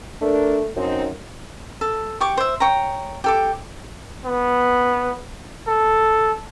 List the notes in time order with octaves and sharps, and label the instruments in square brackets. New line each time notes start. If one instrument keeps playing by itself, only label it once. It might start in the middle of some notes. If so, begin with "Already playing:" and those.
[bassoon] A3 [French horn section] D4 A#4
[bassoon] F#2 [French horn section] C4 D#4
[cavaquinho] A4
G4 C#6 D6
C5 E5
C#5 G5 A#5
G4 A4 D6
[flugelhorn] B3
A4